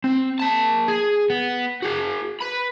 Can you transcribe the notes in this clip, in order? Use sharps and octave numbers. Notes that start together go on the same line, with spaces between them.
C4
A#3 A5
G#4
B3
F#4 G#4
B4 B5